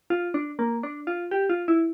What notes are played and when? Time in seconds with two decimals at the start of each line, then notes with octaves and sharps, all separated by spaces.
0.10 F4
0.34 D4
0.59 A#3
0.83 D4
1.07 F4
1.31 G4
1.50 F4
1.68 E4